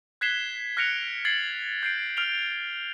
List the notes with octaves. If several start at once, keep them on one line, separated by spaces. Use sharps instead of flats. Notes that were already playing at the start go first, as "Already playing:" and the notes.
F#6 G#6 B6 C7 E7 G7
F6 F#6 A#6 C#7 D7 F7
G#6 A6 C7 C#7 F#7
G6 C7 D7
F6 D7 F7 G7